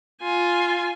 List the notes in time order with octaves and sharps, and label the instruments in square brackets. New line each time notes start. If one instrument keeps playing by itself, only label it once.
[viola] F4 G#5